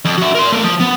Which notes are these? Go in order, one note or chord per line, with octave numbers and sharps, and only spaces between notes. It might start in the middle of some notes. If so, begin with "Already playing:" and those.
F2
F#4 E5
A#4 C6
A3 A#4
F3
B3